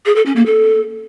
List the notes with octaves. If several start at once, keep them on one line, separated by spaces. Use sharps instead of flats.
G#4
A4
C#4
A#3
A4